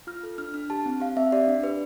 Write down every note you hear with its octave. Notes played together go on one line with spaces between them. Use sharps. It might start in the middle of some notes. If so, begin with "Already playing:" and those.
F4 F6
A4
D4 F6
D4 F6
G4 A5
C4
G4 F5
C4 E5
G4 D5
D4
G4 B4